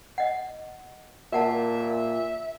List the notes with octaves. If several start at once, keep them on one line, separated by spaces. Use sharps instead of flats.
D#5 F#5
A#2 A#4 E5 F#5 A5